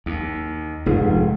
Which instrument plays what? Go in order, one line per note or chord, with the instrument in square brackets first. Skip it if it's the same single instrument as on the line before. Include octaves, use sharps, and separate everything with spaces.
[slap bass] D#2
[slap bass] F1 [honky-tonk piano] F2 G#2